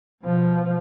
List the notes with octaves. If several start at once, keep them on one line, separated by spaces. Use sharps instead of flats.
B2 F3